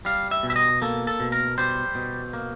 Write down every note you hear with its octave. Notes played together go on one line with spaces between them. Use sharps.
G3 F5
E5
B2
E5
D#5
A#3 A4
A4
B2
A#4
G3 C5
B2
A#3